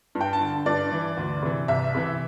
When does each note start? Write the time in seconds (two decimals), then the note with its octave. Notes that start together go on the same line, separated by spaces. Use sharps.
0.15 G2
0.21 G5
0.33 A5
0.41 D3
0.66 G2 D5
0.92 E3
1.17 D2
1.43 C3 E3
1.68 C2 E5
1.95 C3 E3